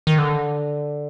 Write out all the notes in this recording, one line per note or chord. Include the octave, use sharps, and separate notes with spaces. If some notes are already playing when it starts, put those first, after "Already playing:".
D#3
D3